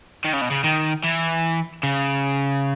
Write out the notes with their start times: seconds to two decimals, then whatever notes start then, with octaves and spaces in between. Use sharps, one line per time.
0.25 D#3
0.33 C#3
0.42 B2
0.51 C#3
0.64 D#3
1.04 E3
1.83 C#3